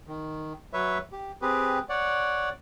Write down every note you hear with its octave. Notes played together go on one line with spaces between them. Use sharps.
D#3
F#3 B4 C#5 E5
G4
C4 G4 G#4 B4
C#5 D5 F#5